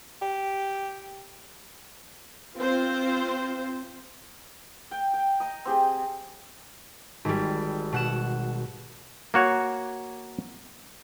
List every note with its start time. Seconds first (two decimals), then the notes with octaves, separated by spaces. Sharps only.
0.22 G4
2.58 C4 F4 C5
4.91 G5
5.14 G5
5.40 D#5 A#5
5.65 C4 G4 G#4
7.25 G#1 G3
7.92 B2 F#5 E7
9.34 A#3 F#4 C#5